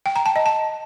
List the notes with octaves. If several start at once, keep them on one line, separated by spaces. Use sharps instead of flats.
G5
A#5
A5
D#5
A5